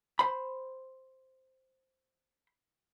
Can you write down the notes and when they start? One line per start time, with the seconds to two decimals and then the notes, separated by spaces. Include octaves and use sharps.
0.19 C5 B5